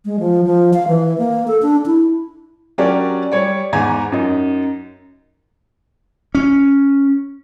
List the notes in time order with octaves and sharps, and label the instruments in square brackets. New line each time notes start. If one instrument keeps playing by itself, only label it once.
[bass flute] G#3
F3
F3
F5
E3
A#3
A4
D4
E4
[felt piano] F#3 C#4 D4 G4 A#4 D5
G3 C#5 D5
E2 G#2 B3 G#5 A#5 G#6
F#2 D#4
[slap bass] C#4